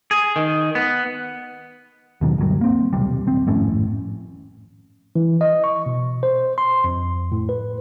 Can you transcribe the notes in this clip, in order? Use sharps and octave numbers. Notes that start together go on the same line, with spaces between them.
G#4
D#3
B3
D#2 B2 D#3 F#3
D2 G2 F#3 G3
A#3 C4
D#1 B1 C3 G3
D#1 C4
G#1 F2 A2 C#4
E3
D#5
C#6
B2
C5
C6
F2
A2
B4